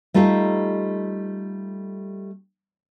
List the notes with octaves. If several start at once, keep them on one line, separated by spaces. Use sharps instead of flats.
G3 A3 D#4 F4 G4 A4